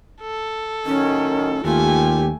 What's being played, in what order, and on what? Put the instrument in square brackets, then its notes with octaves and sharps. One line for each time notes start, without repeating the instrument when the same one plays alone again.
[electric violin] A4
[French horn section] F#2 A2 D#3 [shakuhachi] C#4
[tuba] D#2 [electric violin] A3 G#5 [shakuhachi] F4 [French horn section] G4